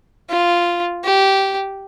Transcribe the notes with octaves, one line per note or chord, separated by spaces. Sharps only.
F4
G4